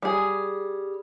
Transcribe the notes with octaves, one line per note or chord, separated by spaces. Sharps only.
G3 G#4